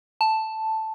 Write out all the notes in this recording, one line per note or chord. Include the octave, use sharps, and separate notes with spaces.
A5